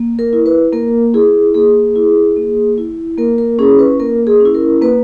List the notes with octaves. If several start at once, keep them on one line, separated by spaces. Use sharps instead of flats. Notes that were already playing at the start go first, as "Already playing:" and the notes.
Already playing: A#3
A#4
E4
B4
A#3 A#4
E4 G#4
A#3 G#4
E4
A#3
E4
A#3 A#4
A#4
C#4 E4 G#4
B4
A#3 A#4
G#4
C#4
E4
A#4
A#3 B4